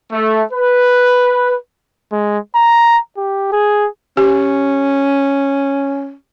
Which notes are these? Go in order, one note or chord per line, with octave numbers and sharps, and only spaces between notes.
A3
B4
G#3
A#5
G4
G#4
C#4 G4 G#5